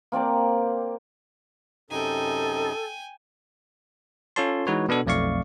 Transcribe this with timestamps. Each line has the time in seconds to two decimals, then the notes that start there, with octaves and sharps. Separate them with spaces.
0.12 A#3 C4 D5 A5
1.91 F#2 C3 D#4 A4 G5 G#5
4.36 C#4 F4 A4 C#5 A5 C6
4.67 E3 G#3 D#4 F#4 B4 C#5
4.89 B2 B3 D4 A4
5.06 B1 F2 A3 D5 F5 C#6